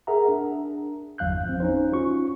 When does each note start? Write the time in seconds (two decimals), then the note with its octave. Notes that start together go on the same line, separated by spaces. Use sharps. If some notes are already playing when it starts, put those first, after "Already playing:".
0.07 G#4 A#4 E5 F#5 A#5
0.28 D4
1.18 G1 E2 F#3 F5 F#6 G6
1.46 F3 C4
1.60 C#4 D#4 C5
1.92 C#4 F4 F#4 C#6